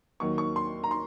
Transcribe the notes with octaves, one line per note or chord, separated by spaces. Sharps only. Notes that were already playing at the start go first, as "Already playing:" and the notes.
D#2 D#3 F#3 C#6
C#6
C6
A#5
C6